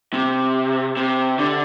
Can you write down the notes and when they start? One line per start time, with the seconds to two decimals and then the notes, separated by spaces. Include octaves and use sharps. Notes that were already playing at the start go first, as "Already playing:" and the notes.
0.13 C3
0.97 C3
1.39 D3